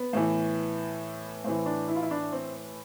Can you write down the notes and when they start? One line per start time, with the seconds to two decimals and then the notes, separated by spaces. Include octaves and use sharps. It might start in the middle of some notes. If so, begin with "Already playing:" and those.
Already playing: B3
0.13 A2 E3
1.44 A2 E3 C4
1.66 D4
1.88 E4
1.96 F4
2.03 E4
2.11 D4
2.33 C4